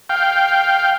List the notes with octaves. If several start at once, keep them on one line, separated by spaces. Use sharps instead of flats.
F5 G5